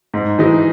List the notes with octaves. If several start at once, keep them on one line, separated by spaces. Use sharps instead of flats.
G#2
E3 G#3 D#4